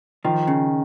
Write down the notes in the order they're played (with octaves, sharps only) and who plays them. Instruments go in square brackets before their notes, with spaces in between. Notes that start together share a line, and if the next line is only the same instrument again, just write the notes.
[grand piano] D#3 [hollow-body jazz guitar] F3
[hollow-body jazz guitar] C#3